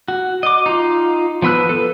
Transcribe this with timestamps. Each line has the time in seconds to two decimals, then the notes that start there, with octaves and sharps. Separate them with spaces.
0.08 F#4
0.43 D#5 D6
0.66 D#4 F4
1.42 F3 B3 B4 E6 F#6
1.69 A4 B4